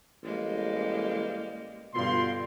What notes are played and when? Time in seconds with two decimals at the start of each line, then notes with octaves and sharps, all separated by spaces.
0.23 A1 G3 G#3 A#3
1.94 G2 B2 D3 F4 C6